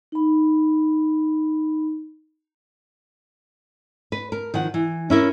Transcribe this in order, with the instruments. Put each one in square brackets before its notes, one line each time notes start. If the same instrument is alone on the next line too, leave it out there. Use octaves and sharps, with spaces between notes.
[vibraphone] D#4 B5
[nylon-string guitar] B4
A#4
D#3 F3 F#5
E3
C#4 E4 A#4